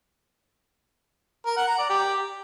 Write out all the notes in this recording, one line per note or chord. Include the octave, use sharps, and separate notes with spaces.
A#4
F#5
A#5
D5
G4